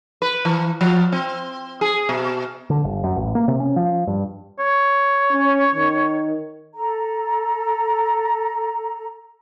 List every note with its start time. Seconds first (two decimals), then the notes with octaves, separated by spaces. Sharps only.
0.22 B4
0.45 E3
0.81 F3
1.12 C4
1.81 G#4
2.09 B2
2.70 D3
2.84 G1
3.04 F#2
3.16 A1
3.35 A#3
3.48 C3
3.60 C#4
3.76 F3
4.07 G2
4.59 C#5
5.32 C#4
5.75 D#3
6.75 A4 A#5